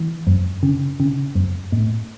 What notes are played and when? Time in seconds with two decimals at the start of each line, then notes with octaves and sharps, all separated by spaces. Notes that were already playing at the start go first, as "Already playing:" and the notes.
Already playing: E3
0.27 F#2
0.63 C#3
1.00 C#3
1.35 F#2
1.72 A2